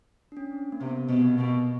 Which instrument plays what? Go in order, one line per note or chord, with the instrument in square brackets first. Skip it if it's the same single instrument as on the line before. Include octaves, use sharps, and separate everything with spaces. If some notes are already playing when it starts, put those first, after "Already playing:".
[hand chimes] D4
C#4
C4
A#3
[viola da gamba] C3 [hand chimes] B3
[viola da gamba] B2 [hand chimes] B3
[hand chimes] A#3
[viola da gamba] B2 [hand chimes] B3